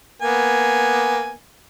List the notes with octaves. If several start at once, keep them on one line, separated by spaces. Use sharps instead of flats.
A#3 B3 G#5